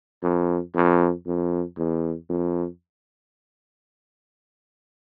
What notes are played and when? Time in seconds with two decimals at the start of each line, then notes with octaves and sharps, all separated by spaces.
0.23 F2
0.75 F2
1.26 F2
1.78 E2
2.30 F2